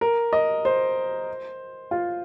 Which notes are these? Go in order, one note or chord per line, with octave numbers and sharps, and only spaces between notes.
A#4
D#5
C5
F4